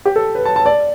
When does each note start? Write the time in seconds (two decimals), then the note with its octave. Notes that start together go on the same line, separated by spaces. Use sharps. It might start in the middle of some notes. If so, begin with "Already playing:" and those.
0.05 G4
0.16 A4
0.35 B4
0.45 A5
0.56 A5
0.66 D5